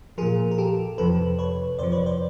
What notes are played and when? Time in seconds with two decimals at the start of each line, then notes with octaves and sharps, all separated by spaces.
0.18 A#2 F3 G#4 A#4
0.51 A#4
0.58 G4 A4
0.98 F2 C3 F3 A4 B4
1.39 B4 C#5
1.79 F2 C3 F3 C5 D5
1.92 B4 C#5
2.06 C5 D5